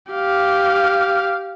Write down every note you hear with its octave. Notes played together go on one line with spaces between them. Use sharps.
G4 F5